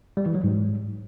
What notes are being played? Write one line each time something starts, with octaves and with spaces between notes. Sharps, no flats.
G3
E3
F#3
G#2